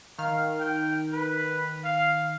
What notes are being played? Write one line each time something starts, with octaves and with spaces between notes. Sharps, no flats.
D#3 F5 F6
G5
B4
F5